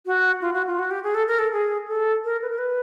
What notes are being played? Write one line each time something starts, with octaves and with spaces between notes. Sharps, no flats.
F#4
F4
F#4
F4
F#4
G4
G#4
A4
A#4
A4
G#4
A4
A#4
B4
A#4
B4